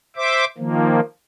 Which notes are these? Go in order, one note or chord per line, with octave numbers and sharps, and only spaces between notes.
C5 E5 D6
D#3 F3 A#3